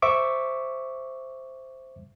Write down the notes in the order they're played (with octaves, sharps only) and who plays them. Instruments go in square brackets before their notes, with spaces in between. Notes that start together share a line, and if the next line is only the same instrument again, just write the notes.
[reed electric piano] C5 E5 C#6 D6